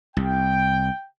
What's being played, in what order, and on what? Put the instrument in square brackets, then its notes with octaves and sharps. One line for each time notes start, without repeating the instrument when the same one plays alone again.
[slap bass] C2 [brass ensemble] G5